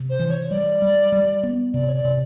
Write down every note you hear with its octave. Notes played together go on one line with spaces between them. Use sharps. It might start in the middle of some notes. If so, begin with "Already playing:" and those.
Already playing: C3
C5
E3
C#5
G3 D5
G3
G3
B3
C3 D5
C#5
D5
C3